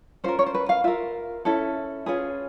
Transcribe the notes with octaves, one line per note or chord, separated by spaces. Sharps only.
C#4 F4 A#4 C5
C#5
C5
B4
F5
F4 A#4 E5
C#4 E4 A4
C#4 F4 G#4 B4